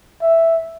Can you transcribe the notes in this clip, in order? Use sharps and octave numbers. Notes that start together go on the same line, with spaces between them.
E5